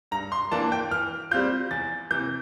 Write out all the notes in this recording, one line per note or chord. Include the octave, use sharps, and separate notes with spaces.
G2 A#5
C6
E3 A#3 D4 A5
G5
E3 F6
G3 C4 F4 G6
E2 A6
C3 E3 G6